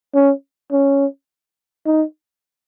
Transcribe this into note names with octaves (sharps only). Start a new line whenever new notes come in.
C#4
C#4
D#4